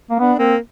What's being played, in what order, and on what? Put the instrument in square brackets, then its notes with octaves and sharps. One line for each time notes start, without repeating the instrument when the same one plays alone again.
[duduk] A#3
[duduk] B3 [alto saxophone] D4
[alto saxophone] A#3 [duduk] C4